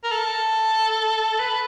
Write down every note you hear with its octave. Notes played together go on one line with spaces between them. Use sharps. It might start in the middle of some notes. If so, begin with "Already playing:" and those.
A#4
A4
B4